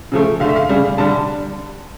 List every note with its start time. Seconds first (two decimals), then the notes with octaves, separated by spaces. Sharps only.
0.12 C#3 F3 A3
0.40 D3 A3 F5
0.49 E5
0.56 F5
0.69 C#3 G3
0.98 D3 G3 A5